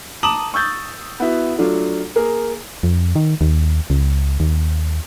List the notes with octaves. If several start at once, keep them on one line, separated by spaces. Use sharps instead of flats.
A5 A#5 D6 D#6 E7 F#7
C#6 E6 G6 A6
B3 E4 F#4
F#3 A3 D4 F4
A#3 G#4 A#4
F2
D#3
D#2
C#2
D#2